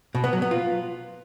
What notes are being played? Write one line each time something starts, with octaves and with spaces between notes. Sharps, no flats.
B2
B3
F#3
B3
F4